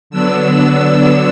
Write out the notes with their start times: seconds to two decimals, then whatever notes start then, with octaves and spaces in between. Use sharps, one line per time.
0.10 D3 F#3 B3 D4 E6